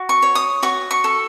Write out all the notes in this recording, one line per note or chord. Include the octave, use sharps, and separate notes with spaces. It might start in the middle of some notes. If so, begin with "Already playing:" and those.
Already playing: F#4
C#6
C#5
D#6
F#4 C#6
C#6
A4